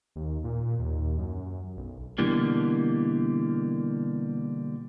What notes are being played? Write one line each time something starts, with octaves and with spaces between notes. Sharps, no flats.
D#2
A#2
D#2
F#2
B1
B2 D3 E3 G3 A#3